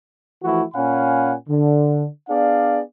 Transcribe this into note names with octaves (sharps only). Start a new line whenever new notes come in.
E3 F3 A3 E4 F#4
A#2 C#4 F5 F#5 G#5 B5
D3
B3 D4 G#4 D5 F5